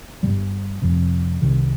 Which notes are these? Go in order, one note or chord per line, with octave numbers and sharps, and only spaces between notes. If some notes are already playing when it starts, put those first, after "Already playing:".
G1 G2 D#3 G3
F1 F2 C3
C2 C3 D#3